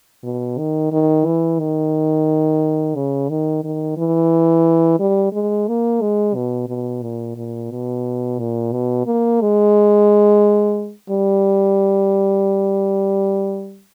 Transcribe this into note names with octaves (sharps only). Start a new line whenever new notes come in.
B2
D#3
D#3
E3
D#3
C#3
D#3
D#3
E3
G3
G#3
A#3
G#3
B2
B2
A#2
A#2
B2
A#2
B2
A#3
G#3
G3